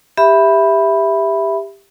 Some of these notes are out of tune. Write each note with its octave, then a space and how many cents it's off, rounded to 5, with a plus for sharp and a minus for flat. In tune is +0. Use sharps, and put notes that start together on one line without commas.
G4 +15 E5 +0 B5 +0